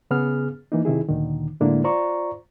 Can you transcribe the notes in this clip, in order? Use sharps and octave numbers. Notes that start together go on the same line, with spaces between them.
C#3 B3 G#4 F6
E3 A#3 D#4
C3 D#3 E4 G#4
D2 A#2 D3 D#3
A2 D3 G#3 A#3 D4 E4
F4 C5 D5 A#5 C#6